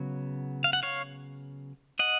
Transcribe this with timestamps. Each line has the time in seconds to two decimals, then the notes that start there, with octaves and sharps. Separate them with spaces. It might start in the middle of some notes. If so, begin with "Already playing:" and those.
Already playing: C#3 F#3 B3
0.64 F5
0.73 F#5
0.83 C#5 F5
1.99 D#5 F#5